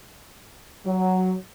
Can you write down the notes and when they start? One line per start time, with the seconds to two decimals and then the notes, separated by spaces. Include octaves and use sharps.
0.86 F#3